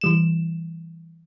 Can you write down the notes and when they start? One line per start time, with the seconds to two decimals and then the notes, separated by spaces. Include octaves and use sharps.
0.01 E3 G3 E7